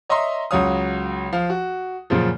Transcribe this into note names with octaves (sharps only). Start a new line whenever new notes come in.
C#5 D#5 E5 A#5 C6
C#2 F#3 F#4 C#5 F5 D#6
F3 F5
F#4
F#2 A#2 C#3 F3